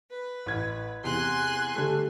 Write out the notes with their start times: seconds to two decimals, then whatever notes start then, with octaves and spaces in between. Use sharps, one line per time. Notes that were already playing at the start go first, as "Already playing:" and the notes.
0.11 B4
0.46 A1 G#6
1.04 E2 C3 G#5 C6 F#6
1.75 D3 G3 A3